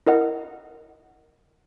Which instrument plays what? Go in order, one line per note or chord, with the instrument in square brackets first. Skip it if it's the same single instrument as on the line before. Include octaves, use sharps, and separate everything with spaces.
[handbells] E4 A#4 D#5 F#5